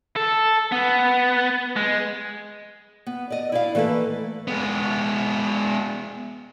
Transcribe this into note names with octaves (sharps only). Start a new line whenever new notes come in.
A4
B3
G#3
B3
D5 D#5
E4 D5 F5
E3 A3 A#3 A4 B4
G#3 B3